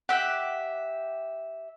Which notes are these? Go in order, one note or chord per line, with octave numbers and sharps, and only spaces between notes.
G4 E5 F#5 F#6